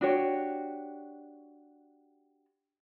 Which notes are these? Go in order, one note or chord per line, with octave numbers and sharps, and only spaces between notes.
D4 F#4 G4 C#5